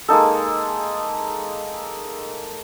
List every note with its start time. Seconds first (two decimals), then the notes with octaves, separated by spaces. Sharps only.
0.08 G#3 A#3 D#4 A4